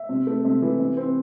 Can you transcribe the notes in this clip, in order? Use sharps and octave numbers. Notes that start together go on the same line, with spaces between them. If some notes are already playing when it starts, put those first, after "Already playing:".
Already playing: E5
C3
A3
C3
E3
C3
C4